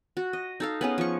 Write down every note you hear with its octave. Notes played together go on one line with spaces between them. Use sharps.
F#4
D#5
D#4 A4 F5
B3 C#4 G#4
F3 C#6